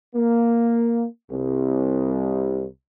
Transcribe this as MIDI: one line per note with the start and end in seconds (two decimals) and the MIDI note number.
0.15 1.05 58
1.31 2.66 36